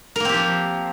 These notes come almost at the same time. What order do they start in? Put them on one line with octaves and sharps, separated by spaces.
A#4 A#3 C4 G4 F3